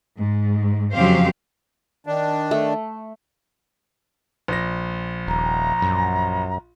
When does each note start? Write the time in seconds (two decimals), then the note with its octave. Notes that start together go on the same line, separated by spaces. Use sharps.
0.18 G#2
0.94 F2 C#3 F#3 G4 C5 F5
2.07 D#3 D4
2.51 A3
4.48 A#1 A#6
5.27 D#1 A#5
5.82 F#2